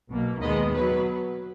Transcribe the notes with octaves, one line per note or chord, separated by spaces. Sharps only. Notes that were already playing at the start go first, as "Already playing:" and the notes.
B1 B2 A#3
D#2 D#3 G#3 B3 B4 D#5
B2 F#3 B4